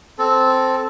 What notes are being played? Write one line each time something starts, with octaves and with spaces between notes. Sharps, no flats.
C4 A4